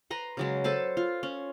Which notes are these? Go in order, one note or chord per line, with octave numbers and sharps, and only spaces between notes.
B4 A#5 C6
C#3 F#3 G#3
A4 B4 C5 A5
F4
C#4